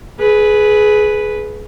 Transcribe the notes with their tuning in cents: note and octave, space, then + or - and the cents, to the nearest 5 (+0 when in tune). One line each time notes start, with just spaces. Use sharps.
G#4 +20 B4 +0